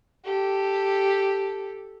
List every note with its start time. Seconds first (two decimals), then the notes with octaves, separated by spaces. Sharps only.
0.24 G4 A4